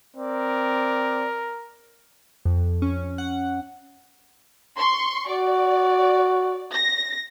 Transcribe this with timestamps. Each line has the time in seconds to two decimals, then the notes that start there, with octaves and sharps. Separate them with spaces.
0.17 C4 A#4 D5
2.45 F2
2.82 C#4
3.18 F#5
4.77 C6 C#6
5.29 F#4 D5
6.73 A#6